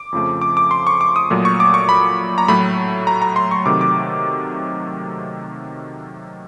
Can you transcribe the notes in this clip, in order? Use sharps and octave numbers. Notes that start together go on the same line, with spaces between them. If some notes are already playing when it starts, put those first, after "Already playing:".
Already playing: D6
F2 C#3 F3 A3
D6
D6
C6
C#6
D6
D#6
A#2 F#3 A3
C#6
D6
C#6
B5
A#5
A2 F#3 A3 B5
A#5
A#5
C6
C#6
C3 D#3 F#3 A3 D6
D6